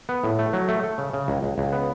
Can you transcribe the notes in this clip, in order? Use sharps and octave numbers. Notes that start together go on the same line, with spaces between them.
B3
A2
A3
F#3
A3
A3
C#3
C#3
C#2
C#2
C#2
B3